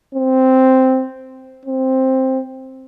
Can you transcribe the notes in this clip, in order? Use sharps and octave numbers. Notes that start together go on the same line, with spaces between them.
C4
C4